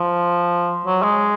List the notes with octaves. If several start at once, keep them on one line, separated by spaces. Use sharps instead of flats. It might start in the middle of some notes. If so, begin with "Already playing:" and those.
Already playing: F3
F#3
G#3